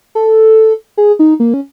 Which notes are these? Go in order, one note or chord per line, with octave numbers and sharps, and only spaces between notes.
A4
G#4
D#4
A#3
C#4